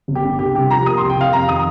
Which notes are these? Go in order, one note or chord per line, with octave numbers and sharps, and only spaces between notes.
G1
G4
G2
C2 G4
C3 G4
F3 A#5
A#3 D#6
C2 C6
G5
C3 F5
F2 A#5
D#3 D#6